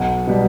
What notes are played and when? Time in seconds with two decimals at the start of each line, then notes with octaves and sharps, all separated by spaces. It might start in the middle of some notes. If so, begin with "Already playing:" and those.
Already playing: B1 F#5
0.27 B2 G3